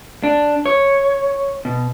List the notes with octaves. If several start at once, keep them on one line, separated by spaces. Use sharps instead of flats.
D4
C#5
B2